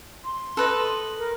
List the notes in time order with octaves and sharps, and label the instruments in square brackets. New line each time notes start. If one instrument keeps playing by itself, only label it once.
[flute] C6
[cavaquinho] A4 B4 D#5
[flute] A#4